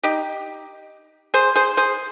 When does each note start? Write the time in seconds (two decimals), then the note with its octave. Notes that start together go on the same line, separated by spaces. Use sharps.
0.03 D#4 G4
1.34 G#4 C5
1.55 G#4 C5
1.77 G#4 C5